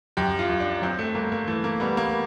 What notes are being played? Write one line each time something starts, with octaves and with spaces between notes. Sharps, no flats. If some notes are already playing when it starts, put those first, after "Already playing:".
F#2 G4
F4
F#2
D4
F#3 C4
A3
G2 A#3
A#3
E3 A3
A#3
G3 B3
A#3